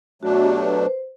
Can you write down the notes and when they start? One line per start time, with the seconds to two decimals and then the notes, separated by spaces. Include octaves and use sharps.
0.22 B2 F#3 A3 D4 F#4
0.35 F#4
0.43 G4
0.62 B4
0.82 C5